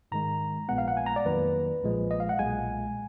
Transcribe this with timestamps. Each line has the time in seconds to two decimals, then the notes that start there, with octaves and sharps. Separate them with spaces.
0.12 G#2 D#3 G#3 A#5
0.69 A#1 A#2 G#3 B3 F#5
0.78 F5
0.88 F#5
0.97 G#5
1.06 A#5
1.16 D5
1.25 F2 D#3 F#3 A#3 B4
1.83 B1 A#2 F3 G#3
2.11 D#5
2.20 F5
2.29 F#5
2.39 B1 A#2 G#3 G#5